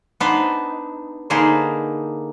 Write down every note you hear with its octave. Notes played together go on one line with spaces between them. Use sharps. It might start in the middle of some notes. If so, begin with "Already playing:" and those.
B3 D4 D#4 B4 C5
D3 A#3 D#4 G#4 B4 C5